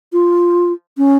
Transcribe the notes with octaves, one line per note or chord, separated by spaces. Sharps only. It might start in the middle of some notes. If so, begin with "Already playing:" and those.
F4
C#4